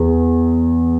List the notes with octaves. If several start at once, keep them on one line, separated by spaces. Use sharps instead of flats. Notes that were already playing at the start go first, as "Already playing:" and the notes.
Already playing: E2